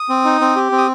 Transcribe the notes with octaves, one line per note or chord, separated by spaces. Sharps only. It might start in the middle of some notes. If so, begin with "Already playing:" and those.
Already playing: D#6
C4
D#4
C4
G4
C4
D#6